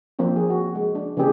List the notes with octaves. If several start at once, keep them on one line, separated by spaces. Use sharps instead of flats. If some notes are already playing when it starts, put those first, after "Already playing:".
F3 A#3 C4 D4
G#4
F#4
G#3
D4
C#3 E3 A#3 C4 G4 G#4